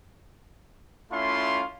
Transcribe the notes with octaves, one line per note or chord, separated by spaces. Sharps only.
A3 C#4 E4 F4 F5 C6